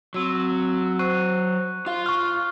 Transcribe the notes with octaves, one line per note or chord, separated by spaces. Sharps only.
F#3 C4 E6
C5 C#6 F#6 D#7
F4 F5 C6
C#6 F6